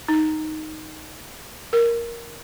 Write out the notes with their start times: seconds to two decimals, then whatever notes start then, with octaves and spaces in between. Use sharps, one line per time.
0.08 D#4
1.73 A#4